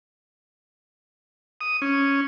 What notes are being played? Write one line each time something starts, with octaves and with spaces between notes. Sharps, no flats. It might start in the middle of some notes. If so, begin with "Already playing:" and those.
D#6
C#4